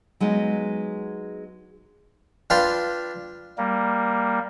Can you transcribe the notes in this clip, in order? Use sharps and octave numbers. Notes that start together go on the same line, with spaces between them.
F#3 G#3 B3 D#4
D4 F4 B4 F5 G5 C6
G3 A#3